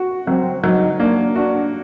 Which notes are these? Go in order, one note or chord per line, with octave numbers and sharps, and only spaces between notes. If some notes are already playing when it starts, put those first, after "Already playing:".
Already playing: F#4
F#3 C4
F#3 D#4
A#3 D4
D4 F#4